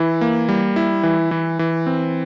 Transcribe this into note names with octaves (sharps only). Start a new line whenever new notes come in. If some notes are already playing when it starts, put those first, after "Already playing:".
Already playing: E3 E4
A#3
G3
E4
E3
E3
E3
C4